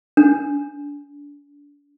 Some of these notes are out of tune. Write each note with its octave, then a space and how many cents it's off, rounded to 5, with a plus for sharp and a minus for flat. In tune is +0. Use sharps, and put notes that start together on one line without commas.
D4 -30